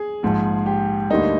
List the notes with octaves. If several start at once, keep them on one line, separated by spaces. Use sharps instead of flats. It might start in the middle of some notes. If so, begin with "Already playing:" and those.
Already playing: G#4
A#1 G#2 F3
G4
D2 D3 G3 A#3 D#4